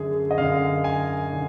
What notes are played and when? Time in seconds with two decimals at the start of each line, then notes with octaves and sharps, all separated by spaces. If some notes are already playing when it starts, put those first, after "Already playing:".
Already playing: F#2 D3 G#4
0.31 D#5
0.38 F#2 D3 F5
0.84 G#5
1.33 D3